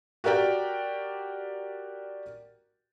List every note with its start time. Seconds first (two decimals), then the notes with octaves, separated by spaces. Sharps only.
0.24 F#4 G4 A#4 D5 G5